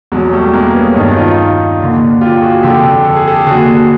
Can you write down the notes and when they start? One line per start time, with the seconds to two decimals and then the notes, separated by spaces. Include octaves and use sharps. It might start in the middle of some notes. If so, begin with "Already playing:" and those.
0.12 E2 B2 F#3 G#3
0.32 G3 A3
0.54 G#3 A#3
0.74 B3 C#4
0.96 G2 C#4 D#4
1.00 D#3
1.16 D#4 F4
1.80 D#2 D3
2.21 F4 G4
2.42 F#4 G#4
2.63 F2 D3 G4 A4
3.04 A4
3.16 G#4
3.28 G4 A4
3.47 D#2 D3 F#4 G#4